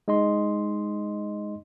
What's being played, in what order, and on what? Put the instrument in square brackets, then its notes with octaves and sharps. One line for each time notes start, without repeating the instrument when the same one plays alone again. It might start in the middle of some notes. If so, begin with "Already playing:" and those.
[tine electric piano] G#3 D#4 D#5 C6